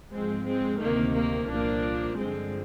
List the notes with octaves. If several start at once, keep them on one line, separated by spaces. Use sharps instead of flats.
G#2 F3 G#3 C4
G#3 C4
D2 C3 D#3 A#3
A#3
C2 A#2 F3 A#3 D4
G2 D3 F3 G#3 C4